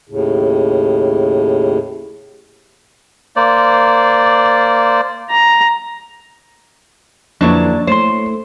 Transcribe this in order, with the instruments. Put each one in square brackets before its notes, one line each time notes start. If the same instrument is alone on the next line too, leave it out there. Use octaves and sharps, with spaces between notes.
[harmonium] D#2 A2 C#3
[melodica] A#3 C5 D5
[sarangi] A#5
[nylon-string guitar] F2 D3 E4 [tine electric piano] F3 B4 [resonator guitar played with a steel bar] F#3 D4 [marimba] A#3
[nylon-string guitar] A3 E4 [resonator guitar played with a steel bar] C5 [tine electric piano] C#5 C6